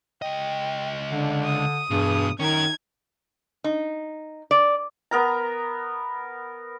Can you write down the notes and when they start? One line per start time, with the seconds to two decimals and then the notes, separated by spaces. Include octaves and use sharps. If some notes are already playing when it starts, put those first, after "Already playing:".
0.22 C#2 D#5 G5
1.12 D3 D4
1.46 D#6
1.91 E2 G2 B2 G#4
2.40 D#3 C#4 D#4 A#4 G#6
3.64 D#4
4.51 D5
5.11 B3 A#4 A#5